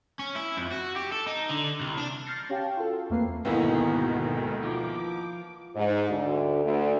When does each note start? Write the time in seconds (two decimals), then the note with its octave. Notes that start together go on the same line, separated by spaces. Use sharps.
0.19 C#4
0.36 E4
0.57 F2
0.71 F#4
0.96 G4
1.12 A4
1.27 D#4
1.50 D3
1.81 C2
1.97 D4
2.26 F6 G6 A6 A#6 C7 C#7
2.49 C#4 G4 F5 G5 A5
2.77 F4 F#4 A4
3.10 E2 A3 A#3 C4 B4 C7
3.45 D2 G#2 B2 D#3 A#3 B3 E4 D#5
4.63 F3 D6
5.75 G#2
6.10 D2
6.65 D2